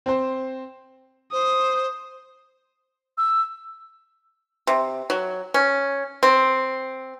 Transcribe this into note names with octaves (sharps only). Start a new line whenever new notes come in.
C4 C5
C5 D#6
E6
C3
F#3
C#4
C4